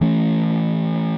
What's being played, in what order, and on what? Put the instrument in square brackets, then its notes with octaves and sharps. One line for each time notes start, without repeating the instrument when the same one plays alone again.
[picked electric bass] E3 A3 C#4